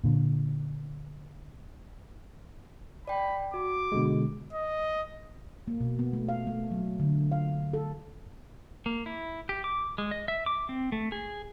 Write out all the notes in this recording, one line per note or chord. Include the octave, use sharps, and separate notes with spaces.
A#2 D3
D5 G5 B5
F#4 D6
B2 D3 G#3
D#5
A#3
B2
B3
A3
F5
A3
F#3
D3
F5
A4
A#3
E4
G4
D6
G#3
D#5
E5
D6
C4
A3
G#4